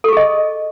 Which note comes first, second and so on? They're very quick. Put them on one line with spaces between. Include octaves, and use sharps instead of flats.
A4 C#6 G#4 D#5